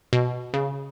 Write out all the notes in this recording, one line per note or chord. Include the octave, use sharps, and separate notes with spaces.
B2
C#3